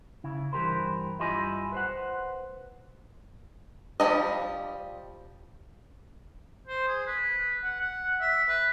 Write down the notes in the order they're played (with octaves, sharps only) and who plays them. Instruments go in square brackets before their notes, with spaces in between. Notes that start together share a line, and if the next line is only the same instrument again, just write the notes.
[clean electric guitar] C#3 E4
G2 E3 G4 A#4 C5
G2 E4 F4 G4 D#5 G#5
B4 C5 F#5
[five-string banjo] F3 G3 D#4 E4 D#5
[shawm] C5
G#4
B4
F#5
F#5
E5
B4